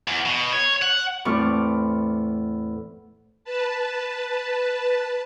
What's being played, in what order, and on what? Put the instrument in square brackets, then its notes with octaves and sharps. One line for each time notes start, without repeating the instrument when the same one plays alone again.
[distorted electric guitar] E2
B2
C#5
F#5
[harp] E2 A2 C4 C#6 D6 F6
[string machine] B4 A5